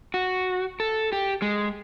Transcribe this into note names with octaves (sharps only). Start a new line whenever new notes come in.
F#4
A4
G4
G#3